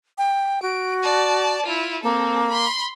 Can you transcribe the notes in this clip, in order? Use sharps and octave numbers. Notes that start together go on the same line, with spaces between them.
G5
F#4 D7
D5 A5
E4 F4
A#3 C4 A4
B5 C6